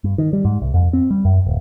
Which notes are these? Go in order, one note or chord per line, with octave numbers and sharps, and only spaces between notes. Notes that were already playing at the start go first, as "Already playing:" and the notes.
G2
D#3
G3
G#2
C2
F2
C4
G3
F#2
D1